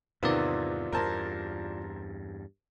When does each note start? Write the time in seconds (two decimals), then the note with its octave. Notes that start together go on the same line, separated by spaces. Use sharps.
0.23 E2 G#2 C3 D#3 B3 F4 D5
0.92 E2 G2 A#4 C5 A5